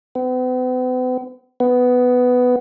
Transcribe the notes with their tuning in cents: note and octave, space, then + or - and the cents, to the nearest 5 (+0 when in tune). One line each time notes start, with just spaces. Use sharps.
B3 +45
B3 +10